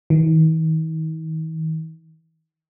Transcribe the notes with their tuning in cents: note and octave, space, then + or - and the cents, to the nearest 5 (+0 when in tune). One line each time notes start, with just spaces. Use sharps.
D#3 +45